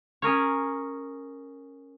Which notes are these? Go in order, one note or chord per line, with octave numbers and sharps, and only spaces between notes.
C#4 G#4 A#4 C#5